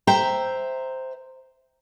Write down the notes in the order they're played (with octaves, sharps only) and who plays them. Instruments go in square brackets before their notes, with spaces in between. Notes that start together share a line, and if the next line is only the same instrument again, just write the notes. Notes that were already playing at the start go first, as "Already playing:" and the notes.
[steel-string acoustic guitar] C5 E5 G5 A#5